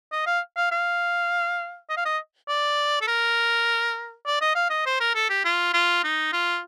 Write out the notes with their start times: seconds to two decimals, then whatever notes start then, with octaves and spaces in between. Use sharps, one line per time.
0.12 D#5
0.26 F5
0.57 F5
0.71 F5
1.89 D#5
1.97 F5
2.05 D#5
2.48 D5
3.01 A4
3.08 A#4
4.27 D5
4.41 D#5
4.55 F5
4.70 D#5
4.86 C5
5.00 A#4
5.15 A4
5.30 G4
5.45 F4
5.74 F4
6.04 D#4
6.33 F4